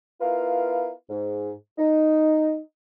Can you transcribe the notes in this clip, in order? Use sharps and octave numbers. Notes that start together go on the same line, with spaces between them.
B3 E4 F4 A#4 B4 F5
G#2
D#4